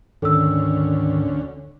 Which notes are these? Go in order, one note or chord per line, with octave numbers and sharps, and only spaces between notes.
D2 G#2 D3 D#3 C#4 A4 E6